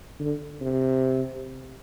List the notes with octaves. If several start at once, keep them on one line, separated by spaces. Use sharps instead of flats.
D3
C3